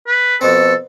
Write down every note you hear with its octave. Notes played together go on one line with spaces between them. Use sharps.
B4
F2 B2 C4 A4